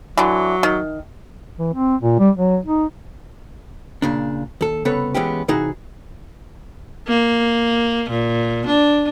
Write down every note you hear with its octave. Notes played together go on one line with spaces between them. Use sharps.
D3 E3 F#3
D#3
E3
C4
A#2
G3
F#3
D#4
A#2 C#3 D4
D#2 A4
C2 C#3 B3 A4 B4 C#5
E3 G#3 B3 C#4 G4
C3 E3 D#4 F#4 G#4
A#3
A#2
D4